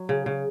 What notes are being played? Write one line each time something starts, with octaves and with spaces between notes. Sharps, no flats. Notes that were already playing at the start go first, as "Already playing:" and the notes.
Already playing: F#3
C#3
C#3